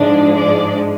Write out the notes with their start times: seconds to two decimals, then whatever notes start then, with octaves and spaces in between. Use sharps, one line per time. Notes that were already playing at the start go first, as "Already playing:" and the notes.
Already playing: G#2 F3 G#3 D4 D5
0.34 D4 D5